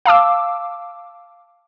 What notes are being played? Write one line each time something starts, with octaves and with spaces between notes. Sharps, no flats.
F5 A5 D6 E6